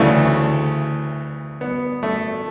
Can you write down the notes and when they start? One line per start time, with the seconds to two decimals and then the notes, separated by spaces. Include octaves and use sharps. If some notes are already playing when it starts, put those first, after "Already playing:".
Already playing: D2 C#3 E3 A3
1.61 B3
2.03 A3